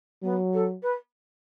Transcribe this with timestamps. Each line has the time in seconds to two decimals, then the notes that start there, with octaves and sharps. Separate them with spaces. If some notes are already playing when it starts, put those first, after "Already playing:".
0.23 F#3 B3
0.53 A4
0.82 B4